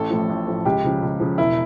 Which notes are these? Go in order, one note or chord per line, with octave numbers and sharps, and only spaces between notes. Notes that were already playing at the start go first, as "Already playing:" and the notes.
Already playing: A1 A4
A2 F3
A1
A2 F3
C#2 G4
C#3 F3
C#2
C#3 F3
E1 E4